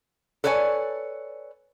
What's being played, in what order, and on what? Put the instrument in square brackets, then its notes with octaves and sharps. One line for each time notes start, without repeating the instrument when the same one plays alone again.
[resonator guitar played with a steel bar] A4 B4 C#5 D5 G#5